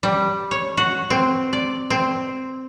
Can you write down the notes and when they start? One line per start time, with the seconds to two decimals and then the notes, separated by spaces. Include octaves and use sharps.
0.03 G3
0.51 C#5
0.77 F#4
1.10 C4
1.53 D5
1.90 C4